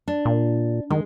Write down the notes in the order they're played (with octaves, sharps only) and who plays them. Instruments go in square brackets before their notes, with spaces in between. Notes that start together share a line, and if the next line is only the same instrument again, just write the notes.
[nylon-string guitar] D4
[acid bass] A#2
[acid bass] D#3 [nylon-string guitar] G#3